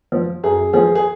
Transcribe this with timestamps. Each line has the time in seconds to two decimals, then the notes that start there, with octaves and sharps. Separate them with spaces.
0.12 F3
0.43 F#2 G#4
0.73 F3 G#4
0.95 G#4